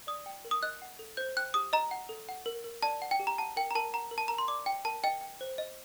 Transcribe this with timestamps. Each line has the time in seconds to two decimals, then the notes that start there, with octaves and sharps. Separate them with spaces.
0.07 D5 D#6
0.26 G5
0.45 A#4
0.51 D#6
0.63 D#5 F#6
0.82 F#5
0.99 A4
1.17 C5 G6
1.37 G5 F#6
1.54 G4 D#6
1.73 D#5 A#5
1.91 F#5
2.09 A4
2.29 F#5
2.46 A#4
2.64 A#4
2.82 D5 A5
3.02 F#5
3.11 G5
3.19 G4
3.27 A#5
3.38 F#5 A5
3.56 A#4 G5
3.71 A#5
3.75 A#4 A5
3.94 F#5 A#5
4.11 A#4
4.18 A5
4.28 A#4 A#5
4.38 C6
4.48 D5 D6
4.66 G5
4.85 A#4 A5
5.04 D#5 G5
5.21 G5
5.41 C5
5.58 D#5